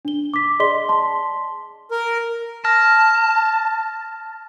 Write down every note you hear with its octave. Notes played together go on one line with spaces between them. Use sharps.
D4 G7
D6 B6
G#4 D5 D#5 C6 B6 G7
A5 C6
A#4
A5 F6 A#6